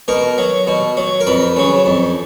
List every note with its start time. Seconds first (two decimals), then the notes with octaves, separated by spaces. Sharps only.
0.08 B2 A#4
0.38 F#3
0.67 B2
0.97 F#3
1.20 A#4
1.27 F2 B4
1.56 C#3 F#3
1.86 F2